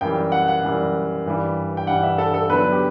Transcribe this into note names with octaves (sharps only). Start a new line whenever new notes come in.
F#2 E3 G3 G5
F#5
F#5
F#2 E3 G3
G2 E3 G3
G5
G2 E3 G3 F#5
E5
A4
A4
E2 D3 F#3 B4
G4